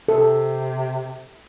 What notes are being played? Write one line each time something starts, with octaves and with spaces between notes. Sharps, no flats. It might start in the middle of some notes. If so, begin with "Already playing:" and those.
C3 A4